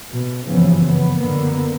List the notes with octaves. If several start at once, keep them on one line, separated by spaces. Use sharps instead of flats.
B2
F#1 G2 C#3 E3 F3 B3
B3
F#2 A2 D3 A#3 B3